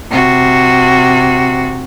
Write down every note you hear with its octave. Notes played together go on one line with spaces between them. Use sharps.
C3 F#4